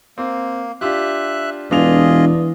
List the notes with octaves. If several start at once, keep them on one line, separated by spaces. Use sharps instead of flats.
A#3 C4
D4 F4 G4 E5 F#6
E1 E3 D4 F4 G#4 D#5 F7